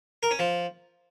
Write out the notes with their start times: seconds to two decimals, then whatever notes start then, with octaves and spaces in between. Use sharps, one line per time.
0.23 A#4
0.31 C#4
0.39 F3